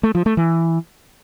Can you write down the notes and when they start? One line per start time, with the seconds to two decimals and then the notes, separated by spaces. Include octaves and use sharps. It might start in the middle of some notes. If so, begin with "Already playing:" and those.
0.03 A3
0.15 F3
0.26 A3
0.37 E3